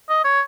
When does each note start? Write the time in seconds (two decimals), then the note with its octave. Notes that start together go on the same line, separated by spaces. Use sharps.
0.09 D#5
0.24 C#5